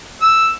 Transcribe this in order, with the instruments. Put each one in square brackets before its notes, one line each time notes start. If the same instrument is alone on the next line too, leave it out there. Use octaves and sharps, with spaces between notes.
[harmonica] E6